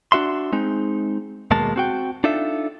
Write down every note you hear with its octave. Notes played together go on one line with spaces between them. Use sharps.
D4 F#4 E5 C6
G#3 C4 D#4
D#2 B2 G#3 A#3 A5
C4 F#4 G5
D4 D#4 F4 A4 E5